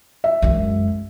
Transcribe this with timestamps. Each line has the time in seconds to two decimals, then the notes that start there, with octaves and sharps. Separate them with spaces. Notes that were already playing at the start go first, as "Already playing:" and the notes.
0.24 E5
0.42 F#2 G#3